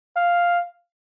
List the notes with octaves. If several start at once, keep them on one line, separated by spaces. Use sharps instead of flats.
F5